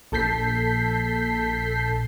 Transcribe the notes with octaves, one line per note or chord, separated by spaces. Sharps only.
A#1 A4 A5 G6 B6 C7